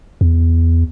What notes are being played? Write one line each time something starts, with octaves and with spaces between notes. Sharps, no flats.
E2